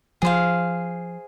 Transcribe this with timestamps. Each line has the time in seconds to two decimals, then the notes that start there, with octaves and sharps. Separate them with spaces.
0.22 F3 G#4 C5 F5